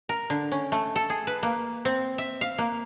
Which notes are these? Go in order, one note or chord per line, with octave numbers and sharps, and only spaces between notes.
A#4
D3
C#4
A3
A4
G#4
B4
A#3
C4
E5
F5
A#3